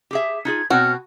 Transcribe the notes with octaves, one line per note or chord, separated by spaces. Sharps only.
G4 G#4 E5
D#4 F4 G#4 G#6
B2 C4 F#4 C#5 F6